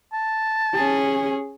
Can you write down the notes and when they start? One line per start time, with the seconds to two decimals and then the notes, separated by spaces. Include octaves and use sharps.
0.13 A5
0.75 C#4 G#4